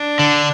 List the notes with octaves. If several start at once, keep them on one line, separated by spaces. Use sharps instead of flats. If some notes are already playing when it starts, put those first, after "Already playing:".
Already playing: D4
D3